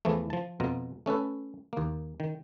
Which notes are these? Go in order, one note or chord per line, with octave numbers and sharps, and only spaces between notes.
E2 E3 F3 A3
F3 A5
F2 B2 F4 A#5
A3 C#4 A4 B4
D#2 A#3
D#3